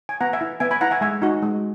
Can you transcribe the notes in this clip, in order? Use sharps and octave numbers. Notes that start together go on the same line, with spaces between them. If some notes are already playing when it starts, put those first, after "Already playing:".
G#5
B3 F#5 A#5
E5 G#5
E4
B3 E5 G#5
G#5 B5
E4 F#5 A#5
E5 G#5
G#3 E5 G#5
D#4 F#4
G#3